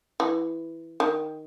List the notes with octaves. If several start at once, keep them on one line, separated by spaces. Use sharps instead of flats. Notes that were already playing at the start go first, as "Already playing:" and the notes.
E3
D#3